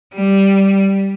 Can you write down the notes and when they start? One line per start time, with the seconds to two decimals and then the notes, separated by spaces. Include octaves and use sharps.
0.15 G3